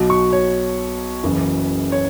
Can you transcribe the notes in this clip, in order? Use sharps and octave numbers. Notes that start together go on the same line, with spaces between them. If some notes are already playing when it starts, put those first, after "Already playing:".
Already playing: B1 B2 F#3
C#6
C#5
F#1 F#2 C#3 E3
C#5